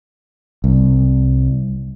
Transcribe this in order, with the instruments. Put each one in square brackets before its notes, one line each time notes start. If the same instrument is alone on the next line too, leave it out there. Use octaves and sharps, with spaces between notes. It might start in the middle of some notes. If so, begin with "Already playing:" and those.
[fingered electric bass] C2